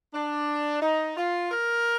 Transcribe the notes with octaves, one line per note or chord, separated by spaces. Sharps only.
D4
D#4
F4
A#4